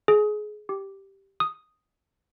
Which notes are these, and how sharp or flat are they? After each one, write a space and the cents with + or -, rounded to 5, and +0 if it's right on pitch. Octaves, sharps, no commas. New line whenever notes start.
G#4 +25
G4 -5
D#6 +0